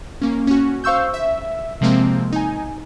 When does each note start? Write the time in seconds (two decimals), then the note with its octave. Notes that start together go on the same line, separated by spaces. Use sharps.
0.21 A#3 C#4
0.47 C#4 F#4
0.84 C5 F5 C#6 E6 G6
1.14 E5
1.81 C3 F3 G#3 A#3 C4
2.32 D#4 G#5